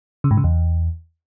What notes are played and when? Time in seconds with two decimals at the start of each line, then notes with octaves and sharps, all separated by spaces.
0.24 C#3
0.31 G#2
0.37 C#3
0.44 E2